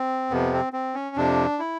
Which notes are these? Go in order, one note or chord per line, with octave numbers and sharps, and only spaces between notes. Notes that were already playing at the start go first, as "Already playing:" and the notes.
Already playing: C4
F2 C3 F3 B3
C4
C4
C#4
F2 C3 F3 D4
E4